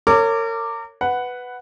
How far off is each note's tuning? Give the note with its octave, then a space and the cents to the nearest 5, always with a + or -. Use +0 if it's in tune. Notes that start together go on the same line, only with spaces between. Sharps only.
A#4 -35 C#5 +0 D6 +0
B4 +5 F#5 +0